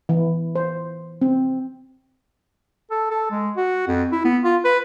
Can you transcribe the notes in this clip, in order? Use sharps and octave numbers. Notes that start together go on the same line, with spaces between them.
E3
C5
C4
A4
A4
G#3
F#4
F2
E4
B3
F4
B4